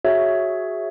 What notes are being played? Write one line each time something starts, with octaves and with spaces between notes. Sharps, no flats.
F#4 G#4 C#5 E5